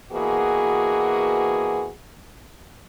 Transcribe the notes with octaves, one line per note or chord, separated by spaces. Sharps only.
B2 E3 A#3 F#4 G#4